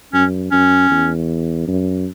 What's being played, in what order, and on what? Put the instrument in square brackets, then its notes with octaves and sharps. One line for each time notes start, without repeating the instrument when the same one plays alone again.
[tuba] F#2 [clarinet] C#4
[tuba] F#2 [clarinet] C#4
[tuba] E2
F#2